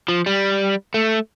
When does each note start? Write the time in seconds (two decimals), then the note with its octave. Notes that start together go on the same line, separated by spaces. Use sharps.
0.08 F3
0.26 G3
0.94 A3